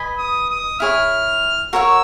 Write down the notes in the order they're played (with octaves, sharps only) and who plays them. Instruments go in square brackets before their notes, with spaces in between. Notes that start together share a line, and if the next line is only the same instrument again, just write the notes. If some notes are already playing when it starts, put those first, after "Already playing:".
Already playing: [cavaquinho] B4 D#5 G#5 B5
[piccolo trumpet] D#6
D#6
[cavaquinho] E4 G#4 C#5 [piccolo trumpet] F6
[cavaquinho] F#4 A#4 C#5 F#5 [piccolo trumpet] E6